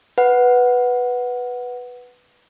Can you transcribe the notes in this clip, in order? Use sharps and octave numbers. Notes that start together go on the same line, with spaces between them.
B4 F#5